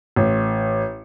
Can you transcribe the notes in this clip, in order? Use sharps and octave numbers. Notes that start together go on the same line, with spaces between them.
A1